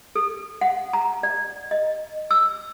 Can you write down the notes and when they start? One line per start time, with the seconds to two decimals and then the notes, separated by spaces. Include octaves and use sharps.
0.15 A4
0.61 F#5
0.93 A#5
1.23 D5
1.71 D#5
2.31 E6